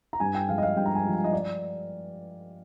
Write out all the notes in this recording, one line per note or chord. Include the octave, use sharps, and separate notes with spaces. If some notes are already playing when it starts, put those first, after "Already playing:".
A#5
G2 G#5
G5
F3 G#3 F5
D#5
F5
G2 G5
A#5
G#5
F3 G#3
G#5
D#5
D5